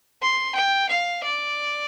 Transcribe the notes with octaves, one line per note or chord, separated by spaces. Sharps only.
C6
G5
F5
D5